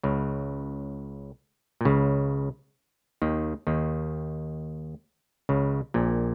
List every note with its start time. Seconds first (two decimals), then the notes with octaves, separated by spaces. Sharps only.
0.03 C#2 C#3
1.81 A#2
1.85 C#2 C#3
3.22 D#2 D#3
3.67 D#2 D#3
5.49 C#2 C#3
5.94 A#1 A#2